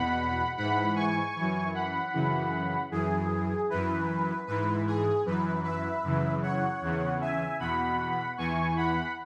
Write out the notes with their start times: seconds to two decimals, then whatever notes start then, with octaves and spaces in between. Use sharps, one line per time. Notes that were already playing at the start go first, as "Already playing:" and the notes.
Already playing: E2 B2 F#5 B5
0.57 G#2 E3 F#5 B5
0.96 G#5 C#6
1.36 F#2 E3
1.74 F#5 B5
2.13 F#2 C#3 E3
2.91 F#2 E3 G#4
3.70 F#2 E3 B4
4.47 G#2 E3 B4
4.87 G#4
5.25 F#2 E3 B4
5.64 B4 E5
6.04 F#2 C#3 E3
6.42 C#5 F#5
6.81 E2 C#3 E3
7.21 E5 G#5
7.59 E2 B2 F#5 B5
8.37 E2 E3 G#5 C#6
8.77 F#5 B5